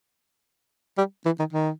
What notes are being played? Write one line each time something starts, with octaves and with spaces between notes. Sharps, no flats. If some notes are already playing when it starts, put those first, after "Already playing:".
G3
E3
D#3
D#3